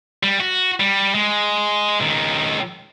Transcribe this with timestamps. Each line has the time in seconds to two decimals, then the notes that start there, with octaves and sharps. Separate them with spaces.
0.23 G3
0.40 F#4
0.80 G3
1.15 G#3
2.01 C#2 D#3